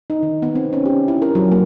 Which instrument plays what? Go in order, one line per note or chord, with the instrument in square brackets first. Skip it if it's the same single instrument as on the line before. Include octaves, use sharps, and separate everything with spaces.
[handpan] D#4
D#3
B3
C4
C#4
G4
E4
A#4
F#3
A#3